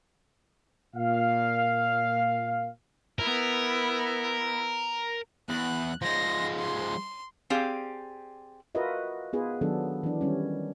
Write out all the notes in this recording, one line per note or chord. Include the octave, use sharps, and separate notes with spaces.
A#2 F5
B3 E4 A#4
E2 F#6
F3 G#3 C6 A#6
C6
C4 G4 G#4 D5 F5
F4 F#4 A#4 B4 D#5 E5
B3 D#4 F4 G#4 B4
D#3 F#3 B3 D4 A4
E3 D4
D#3 G3 C#4